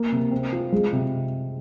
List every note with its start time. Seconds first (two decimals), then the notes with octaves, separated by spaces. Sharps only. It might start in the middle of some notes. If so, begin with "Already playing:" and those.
Already playing: A#3
0.12 C3
0.31 C4
0.52 F4
0.72 G#3
0.93 C3